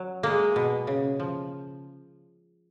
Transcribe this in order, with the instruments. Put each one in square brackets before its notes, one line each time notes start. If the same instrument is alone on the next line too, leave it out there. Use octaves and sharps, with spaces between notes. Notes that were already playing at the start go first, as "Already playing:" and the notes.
Already playing: [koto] F#3
[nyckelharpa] G#3 [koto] A#3
[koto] B2
C#3
F3